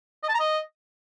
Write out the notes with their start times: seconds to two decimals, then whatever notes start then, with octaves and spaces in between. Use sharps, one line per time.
0.23 D#5
0.29 A5
0.34 A#5
0.40 D#5